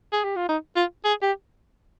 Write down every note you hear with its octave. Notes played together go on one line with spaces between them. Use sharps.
G#4
G4
F4
D#4
F4
G#4
G4